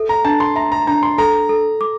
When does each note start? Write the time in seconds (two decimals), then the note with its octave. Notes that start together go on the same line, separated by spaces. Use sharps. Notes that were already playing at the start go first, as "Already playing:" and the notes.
Already playing: A4 E5
0.09 A#5
0.25 D4 A5
0.40 C6
0.56 E5 A#5
0.72 A#5
0.87 D4 A#5
1.03 C6
1.18 A4 A#5
1.49 A4
1.81 D6